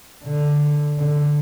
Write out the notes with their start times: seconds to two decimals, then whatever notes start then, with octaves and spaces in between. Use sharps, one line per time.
0.25 D3
0.99 D3